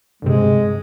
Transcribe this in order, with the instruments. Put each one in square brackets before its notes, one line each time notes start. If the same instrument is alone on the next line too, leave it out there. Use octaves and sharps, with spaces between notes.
[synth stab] D2 G2 C3 [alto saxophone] G#3